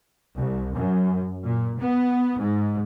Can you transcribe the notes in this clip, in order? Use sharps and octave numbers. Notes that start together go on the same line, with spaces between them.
C2
F#2
A#2
B3
G#2